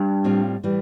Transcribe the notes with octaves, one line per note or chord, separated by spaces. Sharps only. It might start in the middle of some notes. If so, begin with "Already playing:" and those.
Already playing: G2
A2 G3 C4 F4
A2 E3 G3